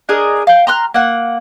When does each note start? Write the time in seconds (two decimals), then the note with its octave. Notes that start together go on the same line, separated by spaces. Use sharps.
0.09 D4 G#4 A#4 D#5
0.47 F5 G5
0.67 A#5 C6 F6 F#6
0.94 A#3 F#5